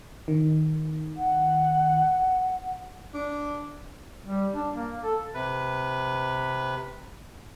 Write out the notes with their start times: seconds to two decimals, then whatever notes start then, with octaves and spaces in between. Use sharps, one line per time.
0.28 D#3
1.17 F#5
3.14 D4
4.26 G3
4.54 D4
4.74 A#3
5.04 A4
5.34 C3 B4